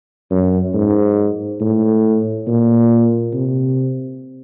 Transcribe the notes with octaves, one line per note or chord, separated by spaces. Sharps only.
F#2
G#2
A2
A#2
C3